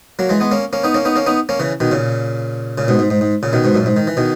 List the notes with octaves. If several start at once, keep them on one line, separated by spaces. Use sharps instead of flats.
F#3 A#3
E3 G#3
G#3 B3
A#3 C#4
A#3 C#4
B3 D#4
A#3 C#4
B3 D#4
A#3 C#4
B3 D#4
A#3 C#4
C#3 E3
B2 D#3
A#2 C#3
A#2 C#3
G#2 B2
G#2
G#2
G#2
A#2 C#3
B2 D#3
G#2 B2
F#2 A#2
G#2
D#3
E3
B2 D#3